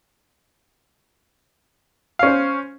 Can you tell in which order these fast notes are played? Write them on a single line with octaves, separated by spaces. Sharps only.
F5 C#4 C5